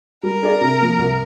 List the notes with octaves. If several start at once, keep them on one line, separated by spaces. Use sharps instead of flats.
G3 A#4
D4 G#4 D5
C3
F3 A#3
C2